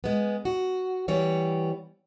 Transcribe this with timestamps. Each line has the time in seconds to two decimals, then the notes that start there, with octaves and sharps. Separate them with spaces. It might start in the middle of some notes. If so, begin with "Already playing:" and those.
0.04 G#3 B3
0.45 F#4
1.08 E3 G3 B3 C#5